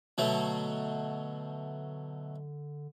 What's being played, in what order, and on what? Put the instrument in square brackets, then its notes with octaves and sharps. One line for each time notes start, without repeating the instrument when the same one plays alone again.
[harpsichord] B2 F#3 A3 [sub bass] D3